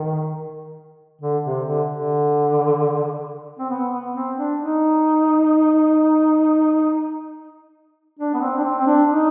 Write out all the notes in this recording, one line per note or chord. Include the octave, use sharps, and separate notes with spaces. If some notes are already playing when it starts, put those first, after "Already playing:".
Already playing: D#3
D3
C3
D3
D3
C4
B3
B3
C4
D4
D#4
D4
B3
C4
D4
C4
C4
D4
D#4